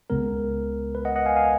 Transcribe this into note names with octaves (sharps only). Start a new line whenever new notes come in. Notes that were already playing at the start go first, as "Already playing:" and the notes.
C#2 C#3 G#3 B3 A#4
B4
D#5 F#5
D#5 F#5
F5 G#5
F5 G#5